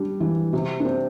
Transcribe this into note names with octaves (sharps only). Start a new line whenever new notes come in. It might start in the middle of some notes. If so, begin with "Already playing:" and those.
Already playing: G3 D4
E3
C3
D4
C4